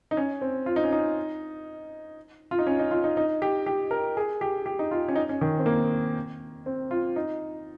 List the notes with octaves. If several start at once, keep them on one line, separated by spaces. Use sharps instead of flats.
D#4
C#4
C4
F4
D#4
C#4
D#4
F4
D#4
C#4
D#4
F4
D#4
D#4
G4
G4
A#4
G#4
G4
G4
D#4
F4
C#4
D#4
C#4
D#3
C4
A#3
C4
F4
D#4